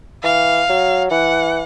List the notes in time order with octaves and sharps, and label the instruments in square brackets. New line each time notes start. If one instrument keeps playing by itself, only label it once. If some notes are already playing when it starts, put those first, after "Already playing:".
[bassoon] E3 [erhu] F5
[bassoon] F#3
[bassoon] E3 [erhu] F#5